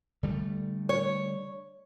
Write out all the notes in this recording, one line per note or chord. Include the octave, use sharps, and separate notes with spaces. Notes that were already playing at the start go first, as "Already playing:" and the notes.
D3 G3 A3
C#5